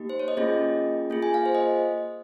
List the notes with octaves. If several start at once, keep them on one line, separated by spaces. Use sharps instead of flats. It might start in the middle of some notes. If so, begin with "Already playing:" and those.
Already playing: A#3 D#4 G4
C5
C#5
D#5
A#3 C#4 F4 G#4
A#3 F4 G#4
G#5
F5
C5
D#5